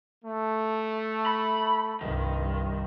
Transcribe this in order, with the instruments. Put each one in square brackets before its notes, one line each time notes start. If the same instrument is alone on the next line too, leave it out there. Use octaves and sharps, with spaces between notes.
[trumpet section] A3
[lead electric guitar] B5
[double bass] C2 G2 [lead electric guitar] D#3